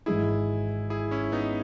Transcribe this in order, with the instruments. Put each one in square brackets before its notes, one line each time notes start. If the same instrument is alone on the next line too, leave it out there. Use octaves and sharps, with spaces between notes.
[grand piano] G#1 G#2 E3 G#3 D#4 [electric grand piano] E4 G#4
[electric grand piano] E4 G#4
C#4 E4
B3 D#4